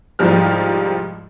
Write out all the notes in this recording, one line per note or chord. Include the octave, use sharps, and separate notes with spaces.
C2 G#2 F3 G3 F6